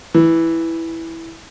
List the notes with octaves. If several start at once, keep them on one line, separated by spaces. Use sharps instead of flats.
E3